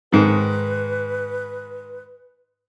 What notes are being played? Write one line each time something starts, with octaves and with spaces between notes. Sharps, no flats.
G#2 D#3 B4